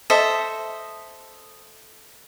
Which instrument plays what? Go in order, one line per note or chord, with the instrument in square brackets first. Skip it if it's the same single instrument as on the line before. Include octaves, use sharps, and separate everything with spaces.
[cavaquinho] A4 C5 D#5 E5